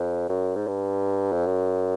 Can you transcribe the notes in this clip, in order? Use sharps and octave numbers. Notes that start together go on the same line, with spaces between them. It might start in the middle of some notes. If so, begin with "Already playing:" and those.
Already playing: F2
F#2
G#2
G2
F2
F#2